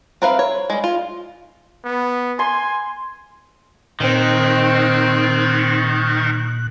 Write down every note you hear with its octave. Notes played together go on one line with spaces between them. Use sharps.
C4 A#4 B4 E5 F5
C#5
G3 G#3
F4
B3
G#5 C6
A#2 D#3 C4 F#6